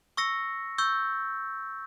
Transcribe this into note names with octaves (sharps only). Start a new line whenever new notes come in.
C#6 E6 A#6 C#7
C#6 E6 G6 A6